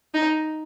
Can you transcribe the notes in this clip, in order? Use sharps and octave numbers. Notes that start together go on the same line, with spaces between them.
D#4